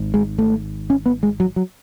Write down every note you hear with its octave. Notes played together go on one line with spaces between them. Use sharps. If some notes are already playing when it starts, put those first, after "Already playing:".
Already playing: G#1 G#2
G#3
A3
C#4
B3
G#3
F#3
F#3